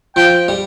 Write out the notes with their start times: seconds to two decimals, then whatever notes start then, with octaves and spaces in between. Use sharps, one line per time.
0.16 F3 G5
0.48 G3